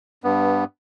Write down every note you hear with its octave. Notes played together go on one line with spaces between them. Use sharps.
G2 B3